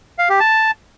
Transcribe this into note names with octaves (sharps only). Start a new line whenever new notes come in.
F5
G4
A5